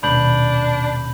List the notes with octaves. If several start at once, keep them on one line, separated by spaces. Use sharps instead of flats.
D#1 B2 D4 B5 G6 F#7